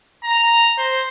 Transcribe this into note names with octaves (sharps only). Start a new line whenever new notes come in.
A#5
C5